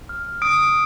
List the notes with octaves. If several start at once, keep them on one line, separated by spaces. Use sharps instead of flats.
F6
D#6 D7